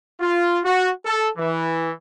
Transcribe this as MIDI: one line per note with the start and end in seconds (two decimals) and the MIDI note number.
0.20 0.60 65
0.65 0.90 66
1.06 1.28 69
1.38 1.91 52